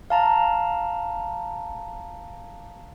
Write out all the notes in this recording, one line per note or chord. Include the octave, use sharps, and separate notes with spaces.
F5 A5 A#5